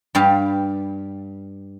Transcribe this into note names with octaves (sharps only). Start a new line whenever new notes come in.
G2 G3 G4 F5